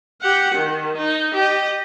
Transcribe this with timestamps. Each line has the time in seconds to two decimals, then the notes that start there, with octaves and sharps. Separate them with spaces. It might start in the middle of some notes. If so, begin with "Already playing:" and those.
0.21 G4 F#5
0.55 D#3
0.98 D#4
1.35 G4 D#5